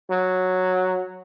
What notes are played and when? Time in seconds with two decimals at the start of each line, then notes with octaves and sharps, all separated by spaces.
0.11 F#3